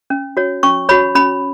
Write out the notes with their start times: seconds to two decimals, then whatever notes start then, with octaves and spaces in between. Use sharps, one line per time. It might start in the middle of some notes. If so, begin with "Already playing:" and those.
0.10 C#4
0.37 F#4 C#5
0.63 C#4 C#6
0.89 F#4 C#5 B5
1.15 C#4 B5